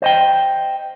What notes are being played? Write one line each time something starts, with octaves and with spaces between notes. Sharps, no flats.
C5 D#5 G5